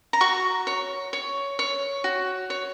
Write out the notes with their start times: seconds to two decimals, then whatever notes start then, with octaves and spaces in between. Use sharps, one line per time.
0.13 A#5
0.21 F#4 C#6
0.67 C#5
1.13 C#5
1.59 C#5
2.04 F#4
2.50 C#5